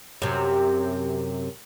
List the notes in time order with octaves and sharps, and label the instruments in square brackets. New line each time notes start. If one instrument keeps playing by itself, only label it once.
[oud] F#2 C3